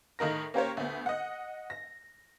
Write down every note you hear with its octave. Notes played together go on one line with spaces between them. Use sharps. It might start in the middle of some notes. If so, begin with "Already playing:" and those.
A2 D#3 D#4 A#4 A#6
A#3 C#4 G4 A#4 C5 C#5
D2 B3
D#5 F#5
A#6